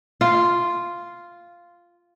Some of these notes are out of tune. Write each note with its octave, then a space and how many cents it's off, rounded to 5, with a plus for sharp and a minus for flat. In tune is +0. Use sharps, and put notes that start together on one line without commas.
F4 -5